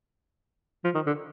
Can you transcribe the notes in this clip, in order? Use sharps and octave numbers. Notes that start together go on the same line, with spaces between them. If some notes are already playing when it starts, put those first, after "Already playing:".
F3
D#3
D3